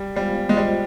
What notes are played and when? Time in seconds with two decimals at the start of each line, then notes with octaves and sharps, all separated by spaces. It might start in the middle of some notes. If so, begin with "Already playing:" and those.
Already playing: G3
0.16 G3 G#3 B3 F4 C5 F5
0.49 G#3
0.56 G3 F4 C5 D#5